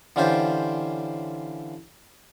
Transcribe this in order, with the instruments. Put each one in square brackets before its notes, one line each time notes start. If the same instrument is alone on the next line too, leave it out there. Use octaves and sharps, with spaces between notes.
[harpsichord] D3 E3 C#4 F4 G4 C5